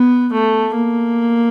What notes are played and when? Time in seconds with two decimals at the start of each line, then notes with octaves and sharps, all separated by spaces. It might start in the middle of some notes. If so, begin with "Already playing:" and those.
Already playing: B3
0.32 A3
0.74 A#3